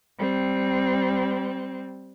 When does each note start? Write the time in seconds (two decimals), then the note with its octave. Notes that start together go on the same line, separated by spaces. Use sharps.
0.18 G3 C4